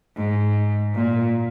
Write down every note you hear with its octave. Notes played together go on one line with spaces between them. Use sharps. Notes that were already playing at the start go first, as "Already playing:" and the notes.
G#2
A#2